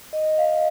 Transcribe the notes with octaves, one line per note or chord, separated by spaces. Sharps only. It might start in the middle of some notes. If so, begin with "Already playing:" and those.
D#5
F5